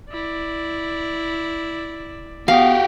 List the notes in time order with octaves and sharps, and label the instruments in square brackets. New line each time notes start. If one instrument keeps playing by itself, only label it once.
[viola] E4 D5
[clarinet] B3 [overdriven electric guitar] F#4 G4 [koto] F5